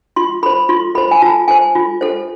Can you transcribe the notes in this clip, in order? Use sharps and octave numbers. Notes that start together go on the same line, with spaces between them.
F4 C6
A4 C5 B5
F4 C6
A4 C5 B5
G#5
F4 A5
A4 C5 G#5
F4
A4 C5